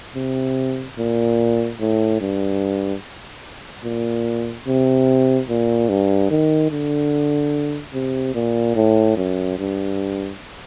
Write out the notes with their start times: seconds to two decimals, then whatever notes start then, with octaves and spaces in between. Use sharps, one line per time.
0.15 C3
0.98 A#2
1.80 A2
2.21 G2
3.84 A#2
4.67 C3
5.49 A#2
5.89 G2
6.31 D#3
6.71 D3
7.94 C3
8.35 A#2
8.76 A2
9.17 F#2
9.59 G2